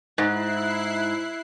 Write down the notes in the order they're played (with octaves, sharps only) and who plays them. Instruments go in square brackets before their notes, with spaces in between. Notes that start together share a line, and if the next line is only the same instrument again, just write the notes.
[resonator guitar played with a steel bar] G#2 [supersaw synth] E4 F#6 C7